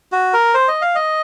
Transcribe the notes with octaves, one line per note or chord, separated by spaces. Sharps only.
F#4
A#4
C5
D#5
F5
D#5